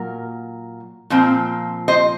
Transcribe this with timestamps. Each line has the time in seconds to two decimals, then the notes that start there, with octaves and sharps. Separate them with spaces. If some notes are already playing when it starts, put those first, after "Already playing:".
Already playing: A#2 F#3 A#4
1.10 A#2 F3 C4
1.88 C5 D#5